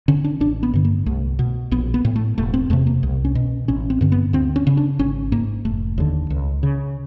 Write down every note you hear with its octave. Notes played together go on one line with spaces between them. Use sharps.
D3 C#4
D4
A1 D4
B3
G2 D3
A#3
C2 A3
B2
A#1 B3
B3
A2
A3
E1 A3
C4
E2 C3 A3
A#3
C2
C#4
B2
A1 C#4
C4
G2 D3
B3
D2 C4
C#4
C#3
D4
G#1 C#4
G#2 A#3
F1 A3
D#2 D3
C#2
C#3